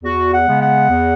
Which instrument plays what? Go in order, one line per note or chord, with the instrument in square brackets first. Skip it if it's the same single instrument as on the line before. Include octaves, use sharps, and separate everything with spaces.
[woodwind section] E2 F#4
F#5
C#3 G#3 B3
F#5
E2